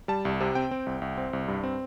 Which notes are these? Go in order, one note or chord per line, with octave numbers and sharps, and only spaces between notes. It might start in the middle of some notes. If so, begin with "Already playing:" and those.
G3 A5
C2
C3
C4 G5
C4
C2
C2
C4
C2
G2
C4